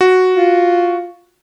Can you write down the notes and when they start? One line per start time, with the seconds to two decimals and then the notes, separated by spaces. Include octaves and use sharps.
0.01 F#4
0.34 F4